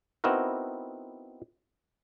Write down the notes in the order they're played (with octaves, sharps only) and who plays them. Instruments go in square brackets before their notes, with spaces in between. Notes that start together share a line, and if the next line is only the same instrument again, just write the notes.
[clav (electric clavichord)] B3 C4 D#4 E4 F#4 A#4